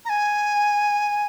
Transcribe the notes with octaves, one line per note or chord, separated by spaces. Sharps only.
A#5
G#5